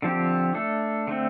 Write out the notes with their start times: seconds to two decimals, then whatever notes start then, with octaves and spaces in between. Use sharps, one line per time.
0.02 D3 F3 C4 G4
0.54 A3 D4 A4
1.07 D3 A3 C4